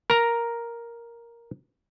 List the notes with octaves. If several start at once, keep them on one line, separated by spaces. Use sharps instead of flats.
A#4 A#5